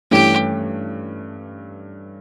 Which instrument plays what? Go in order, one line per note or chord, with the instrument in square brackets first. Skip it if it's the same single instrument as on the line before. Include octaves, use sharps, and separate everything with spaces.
[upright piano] G2 E3 A3 C#4 [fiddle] G4